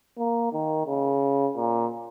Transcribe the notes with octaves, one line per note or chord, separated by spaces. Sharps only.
A#3
D#3
C#3
A#2